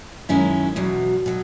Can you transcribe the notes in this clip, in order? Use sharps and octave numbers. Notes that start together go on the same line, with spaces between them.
F#2 D#3 G#3 C#4 E4
E2 B2 F#3
B2 F#3